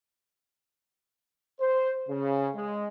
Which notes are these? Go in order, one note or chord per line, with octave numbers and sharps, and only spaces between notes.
C5
C#3
G#3